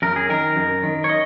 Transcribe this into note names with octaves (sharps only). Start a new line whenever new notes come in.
F#2 A#4
G#4
D#3 A#4
F#2
D#3
C#5
D#5